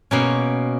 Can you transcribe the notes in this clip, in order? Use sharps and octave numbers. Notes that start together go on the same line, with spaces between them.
B2 A#3 C#4